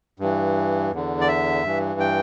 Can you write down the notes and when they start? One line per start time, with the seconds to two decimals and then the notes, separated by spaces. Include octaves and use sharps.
0.20 G2 E3
0.92 E2 D3
1.21 D5
1.28 E5
1.64 G2 E3
2.00 G5